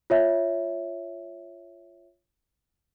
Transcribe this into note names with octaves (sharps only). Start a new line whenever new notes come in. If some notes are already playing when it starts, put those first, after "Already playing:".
F4 C#5 E5